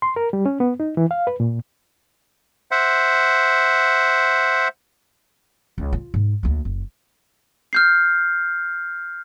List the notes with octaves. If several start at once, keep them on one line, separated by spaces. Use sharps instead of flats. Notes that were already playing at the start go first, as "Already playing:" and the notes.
C6
A#4
G3
C#4
B3
D#4
E3
F5
B4
A#2
C5 E5 F#5
C#2
F4
G#2
D2 A#3
F#1
F6 G6 C7